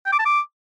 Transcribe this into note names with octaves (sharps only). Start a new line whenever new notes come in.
G5
D6
A5
D6